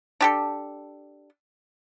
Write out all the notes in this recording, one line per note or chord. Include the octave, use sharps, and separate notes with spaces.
D4 G4 A4